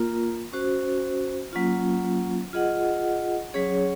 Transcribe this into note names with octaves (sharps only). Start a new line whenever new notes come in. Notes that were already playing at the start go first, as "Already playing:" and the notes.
Already playing: A#3 F4 A#4
C#4 F#4 C5
F#3 A#3 C#4 F4
F4 G#4 D#5 F#5
F#3 C#4 G#4 C#5